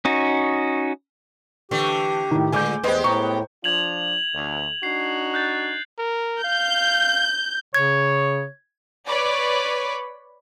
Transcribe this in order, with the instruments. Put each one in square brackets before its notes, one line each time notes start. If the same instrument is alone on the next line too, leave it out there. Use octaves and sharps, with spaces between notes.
[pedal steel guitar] C#4 D#4 F#4
[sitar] D3 A3 [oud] E3 [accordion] G4
[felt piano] A2 D#3
[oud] D2 D3 G#3 [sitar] A#2 [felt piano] G#5 D6 G6
[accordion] E2 [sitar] G#3 G4 [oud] B4 C5 D#5
[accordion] A2 [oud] B3 [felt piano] G5 A#5 C#6
[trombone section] F3 D4 F4 [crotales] G#6 F7 F#7
[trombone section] D2
[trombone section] D4 D#4 F#4 [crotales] C7
[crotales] F#6 G6 A6
[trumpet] A#4
[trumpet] F5 [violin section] G6
[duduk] C#3 [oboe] C#5 [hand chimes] G#6
[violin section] B4 C#5 D5 B5 C#6 D6